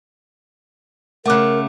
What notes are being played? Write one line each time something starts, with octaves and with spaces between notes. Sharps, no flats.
C#3 A3 A#4 F#5 D6 F#6